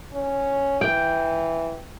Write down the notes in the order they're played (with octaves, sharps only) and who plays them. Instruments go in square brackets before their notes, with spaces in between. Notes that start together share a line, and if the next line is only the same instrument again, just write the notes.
[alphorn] C#4
[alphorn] E3 [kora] G5